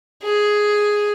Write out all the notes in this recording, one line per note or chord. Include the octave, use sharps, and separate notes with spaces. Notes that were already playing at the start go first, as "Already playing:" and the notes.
G#4